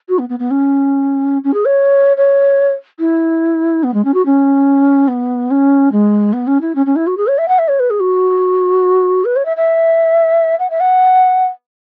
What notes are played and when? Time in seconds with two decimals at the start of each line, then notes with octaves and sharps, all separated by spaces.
0.09 F#4
0.18 B3
0.29 B3
0.39 B3
0.50 C#4
1.44 C#4
1.53 G#4
1.65 C#5
2.17 C#5
2.99 E4
3.83 B3
3.94 G#3
4.04 C#4
4.14 F#4
4.25 C#4
5.08 B3
5.50 C#4
5.92 G#3
6.33 B3
6.47 C#4
6.61 E4
6.75 C#4
6.86 C#4
6.96 E4
7.07 F#4
7.17 G#4
7.27 C#5
7.38 E5
7.48 F#5
7.58 E5
7.68 C#5
7.79 B4
7.90 G#4
8.00 F#4
9.25 B4
9.36 C#5
9.45 E5
9.56 E5
10.59 F#5
10.70 E5
10.80 F#5